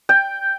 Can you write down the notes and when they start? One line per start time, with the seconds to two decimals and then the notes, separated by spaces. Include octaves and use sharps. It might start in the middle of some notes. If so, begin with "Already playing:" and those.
0.09 G5